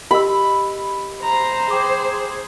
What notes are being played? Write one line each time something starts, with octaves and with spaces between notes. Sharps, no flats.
G4 D#5 B5 E6
C5 A#5
G#4 G5 D6